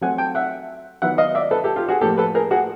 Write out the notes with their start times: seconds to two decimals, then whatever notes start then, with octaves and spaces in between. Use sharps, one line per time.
0.01 F#3 A3 C4 F#5 G#5
0.18 G5 A5
0.35 E5 F#5
1.02 D#3 F#3 B3 E4 E5 F#5
1.18 D#5 F5
1.35 D5 E5
1.51 A4 B4
1.64 G4 A4
1.76 F4 G4
1.88 F#4 G#4
2.01 A2 F3 A#3 G4 A4
2.18 A4 B4
2.35 G#4 A#4
2.51 F#4 G#4